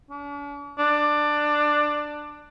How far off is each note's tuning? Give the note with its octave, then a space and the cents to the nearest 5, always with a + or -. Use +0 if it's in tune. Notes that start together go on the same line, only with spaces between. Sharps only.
D4 -45
D4 +15